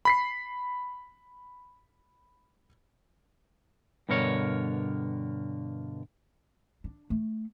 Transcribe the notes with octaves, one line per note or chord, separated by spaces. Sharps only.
B5 B6 C7
G2 B2 D3 A#4 C#5
D4
A3